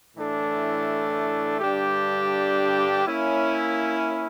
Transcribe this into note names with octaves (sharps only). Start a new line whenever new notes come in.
A2 E3 A3 D4
G2 D3 G3 D4 G4
A#3 C#4 E4